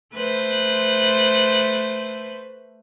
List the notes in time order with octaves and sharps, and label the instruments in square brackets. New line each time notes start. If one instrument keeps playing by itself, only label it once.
[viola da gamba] A3 B4 C5